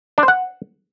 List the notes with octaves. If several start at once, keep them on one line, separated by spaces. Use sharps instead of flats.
D4
C5
F#5